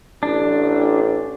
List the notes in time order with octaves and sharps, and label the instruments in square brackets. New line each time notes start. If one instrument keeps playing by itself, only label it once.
[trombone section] A1 [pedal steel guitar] D4